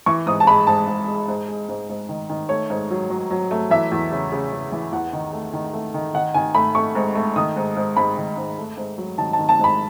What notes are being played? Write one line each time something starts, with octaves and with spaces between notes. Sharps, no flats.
E3 C#6
G#2 D#6
A5
G#3 B5
G#2 A5
G#2
G#3
G#2
G#3
G#2
G#2
D#3
D#3
A3 C#5
G#2
F#3
F#3
F#3
A3
E3 E5
E2
C#3
C#3
C#3
E3
E2 F#5
D#3
A3
D#3
A3
D#3
D#3 F#5
D#3 G#5
A3 B5
A3 C#6
G#2
A3
D#3 D#6
G#2
G#2
G#2 B5
D#3
G#2
A3
G#2
F#3
D#3 A5
A5
D#3
A5
G#2 B5